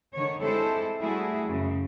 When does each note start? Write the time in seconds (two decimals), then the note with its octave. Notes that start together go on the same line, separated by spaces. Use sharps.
0.14 D3 D#3 C#5
0.42 G#3 C4 E4 G4 A4 C5
1.00 G3 A3 E4 F#4 G#4
1.47 F#2 C#3